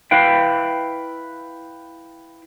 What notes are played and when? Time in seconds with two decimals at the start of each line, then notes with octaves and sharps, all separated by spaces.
0.11 E4 B4 F5 G5